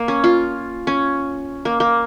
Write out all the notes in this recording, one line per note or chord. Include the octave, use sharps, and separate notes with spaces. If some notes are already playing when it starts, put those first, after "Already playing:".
Already playing: A#3
C#4
F4
C#4
A#3
A#3